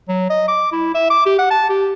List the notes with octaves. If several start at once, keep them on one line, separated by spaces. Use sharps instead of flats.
F#3
D#5
D6
E4
E5
D6
G4
F#5
A5
G4